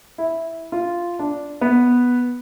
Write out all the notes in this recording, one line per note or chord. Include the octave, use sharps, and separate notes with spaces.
E4
F4
D4
B3